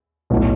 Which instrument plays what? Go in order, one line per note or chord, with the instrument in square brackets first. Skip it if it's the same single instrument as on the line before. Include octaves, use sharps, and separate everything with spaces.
[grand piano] B1 A2 F#3